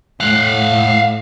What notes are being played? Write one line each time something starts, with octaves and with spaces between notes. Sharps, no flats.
A2 F5 F#5